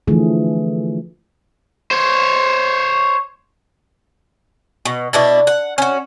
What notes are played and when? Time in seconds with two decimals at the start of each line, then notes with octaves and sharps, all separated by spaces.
0.07 D3 E3 F3 A3 G#4
1.91 C5 C#5
4.85 B2
5.13 B2 D4 E4
5.47 F#5
5.78 C#4 F#4